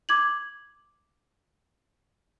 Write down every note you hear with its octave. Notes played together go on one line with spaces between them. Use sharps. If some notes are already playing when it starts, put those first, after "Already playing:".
D6 G#6 F#7